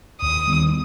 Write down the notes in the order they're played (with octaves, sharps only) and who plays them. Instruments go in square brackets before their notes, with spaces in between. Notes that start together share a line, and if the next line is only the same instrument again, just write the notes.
[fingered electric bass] D#2 [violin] D#6
[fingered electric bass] D#3 G3 B3